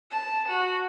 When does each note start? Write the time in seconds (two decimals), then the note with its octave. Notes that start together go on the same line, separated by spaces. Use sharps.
0.11 A5
0.48 F#4